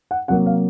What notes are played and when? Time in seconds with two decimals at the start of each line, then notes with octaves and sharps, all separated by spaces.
0.11 F#5
0.28 C3 F#3 A#3 F#5
0.46 F5